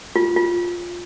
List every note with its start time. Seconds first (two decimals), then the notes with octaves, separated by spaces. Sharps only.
0.16 F4
0.36 F4